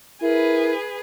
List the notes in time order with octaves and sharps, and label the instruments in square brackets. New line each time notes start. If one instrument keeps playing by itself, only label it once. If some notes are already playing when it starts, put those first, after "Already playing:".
[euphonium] E4 [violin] G#4 B4 [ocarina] A#4